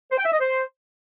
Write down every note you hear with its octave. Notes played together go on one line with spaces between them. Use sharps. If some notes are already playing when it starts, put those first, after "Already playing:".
C5
G5
E5
D#5
C5